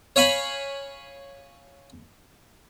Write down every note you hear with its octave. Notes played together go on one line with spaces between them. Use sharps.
C#5 F5 G#5 B5